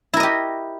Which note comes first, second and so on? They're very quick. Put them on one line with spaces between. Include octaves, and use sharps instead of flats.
E4 A#4 D#5 G4